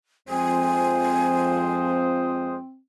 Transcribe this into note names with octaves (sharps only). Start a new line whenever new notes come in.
F2 F3 G#3 C4 C5 G#5 D#6